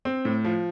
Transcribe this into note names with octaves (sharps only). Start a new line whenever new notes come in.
C4
A2
F3